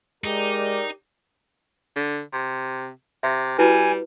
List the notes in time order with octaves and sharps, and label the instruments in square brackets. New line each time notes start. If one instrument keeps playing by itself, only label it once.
[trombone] G#3 [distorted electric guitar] D#4 [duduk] G4 [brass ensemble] A#4 D5
[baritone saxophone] D3
C3
[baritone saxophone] C3 [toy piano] E5
[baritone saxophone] G3 [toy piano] E4 F#4 B4 [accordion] G#5